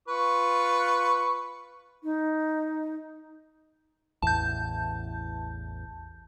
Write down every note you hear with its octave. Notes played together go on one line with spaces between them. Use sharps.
F4 B4 C#6
D#4
A1 E2 A5 G6